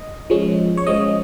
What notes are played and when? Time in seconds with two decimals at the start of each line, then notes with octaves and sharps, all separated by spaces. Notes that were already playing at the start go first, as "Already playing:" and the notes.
Already playing: D#5
0.30 F3 G#3 C#4
0.77 C#5
0.86 F3 G#3 C#4 D#5